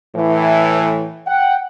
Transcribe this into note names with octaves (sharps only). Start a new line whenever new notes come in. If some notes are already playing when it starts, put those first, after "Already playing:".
A2 E3
F#5 G5